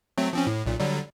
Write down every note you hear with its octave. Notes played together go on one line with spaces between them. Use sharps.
F#3 A3 C4
F3 C4 C#4
A2
B1 A#2
D3 F#3 G3